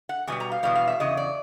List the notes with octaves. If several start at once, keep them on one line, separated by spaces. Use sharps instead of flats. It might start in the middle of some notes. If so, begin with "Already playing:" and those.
F#5
E2 B2 G3 G#5
A#5
F5
E2 B2 G3 F5
F5
E5
E2 C#3 D#5
D5